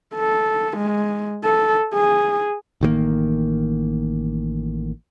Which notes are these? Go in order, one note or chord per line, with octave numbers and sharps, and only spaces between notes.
A4
G#3
A4
G#4
A1 D#3 F#3 A#3